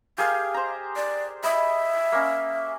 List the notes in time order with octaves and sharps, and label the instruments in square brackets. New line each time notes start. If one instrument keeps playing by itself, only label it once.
[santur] G4 G#4 A#4 [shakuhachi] F5
[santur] C5 A#5
[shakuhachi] D5
[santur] D#5 B5 [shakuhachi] E5
[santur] A#3 C#4